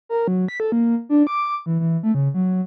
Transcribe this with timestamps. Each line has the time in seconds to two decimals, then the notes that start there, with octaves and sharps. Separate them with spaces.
0.09 A#4
0.28 F#3
0.48 B6
0.60 A4
0.72 A#3
1.09 D4
1.27 D6
1.66 E3
1.80 E3
2.03 A3
2.14 C#3
2.34 F#3